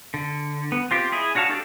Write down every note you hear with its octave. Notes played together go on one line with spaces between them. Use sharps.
D3
B3
C4 F4 G4
E4 G#4 D#5
D4 F#4 C#5 F5 A5
D4 F#4 G4 A4 D5